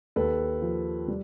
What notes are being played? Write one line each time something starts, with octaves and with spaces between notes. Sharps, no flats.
D#2 A4 B4
F3
G3